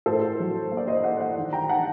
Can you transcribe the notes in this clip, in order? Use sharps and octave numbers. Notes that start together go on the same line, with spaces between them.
A2 A4 C5
F#3
A#3
D5
C5 D#5
A#3 D5 F#5
D5 F#5
D#3
G5 A#5
A#5
D#3 F#5 A5